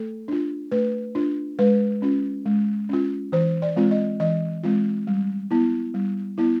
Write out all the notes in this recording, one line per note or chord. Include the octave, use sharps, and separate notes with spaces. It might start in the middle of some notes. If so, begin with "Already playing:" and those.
Already playing: A3 A4
D4 F4
A3 B4
D4 F4
G#3 B4
C#4 F4
G#3
C#4 F4
E3 C5
D5
G#3 C4 F4
D#5
E3 D#5
G#3 C4 F4
G3
B3 E4
G3
B3 E4